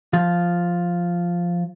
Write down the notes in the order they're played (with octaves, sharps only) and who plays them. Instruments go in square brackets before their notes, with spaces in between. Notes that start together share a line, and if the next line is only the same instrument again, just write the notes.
[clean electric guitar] F3 F4